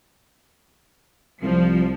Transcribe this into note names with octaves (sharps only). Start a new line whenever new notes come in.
C2 F3